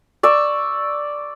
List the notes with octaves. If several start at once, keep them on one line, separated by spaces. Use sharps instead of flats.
D5 C#6 E6